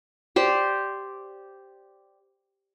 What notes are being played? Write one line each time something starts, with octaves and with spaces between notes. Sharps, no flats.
G4 C5 D5